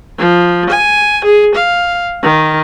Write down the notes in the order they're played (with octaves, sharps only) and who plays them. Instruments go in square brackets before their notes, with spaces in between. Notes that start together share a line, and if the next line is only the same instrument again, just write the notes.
[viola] F3
G#5
G#4
F5
D#3